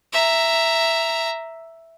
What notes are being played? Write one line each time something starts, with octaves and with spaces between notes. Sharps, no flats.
E5 A#5